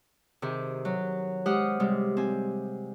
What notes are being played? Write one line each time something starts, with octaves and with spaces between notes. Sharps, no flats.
C3 D#3 G4 G#4
F#3
G#3 G4 C5 F#5 D#6 F6
C3 G3 G#3
C4 G#5